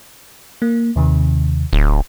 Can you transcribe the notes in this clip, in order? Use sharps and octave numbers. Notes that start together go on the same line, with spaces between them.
A#3
D#2 C3 D#3
D1